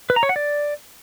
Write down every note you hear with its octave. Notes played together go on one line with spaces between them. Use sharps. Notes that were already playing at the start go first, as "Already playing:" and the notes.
B4
A#5
C#5
F#5
D5